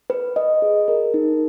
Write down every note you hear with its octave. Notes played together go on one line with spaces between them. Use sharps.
B4
D#5
G#4
A#4
D#4